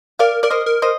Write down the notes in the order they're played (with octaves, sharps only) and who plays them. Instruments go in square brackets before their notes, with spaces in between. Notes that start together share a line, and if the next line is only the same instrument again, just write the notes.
[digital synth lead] A#4 [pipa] D5 F5
[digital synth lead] A#4 [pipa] D5
[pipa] C5 D#5
[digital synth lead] A#4
[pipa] C5 D#5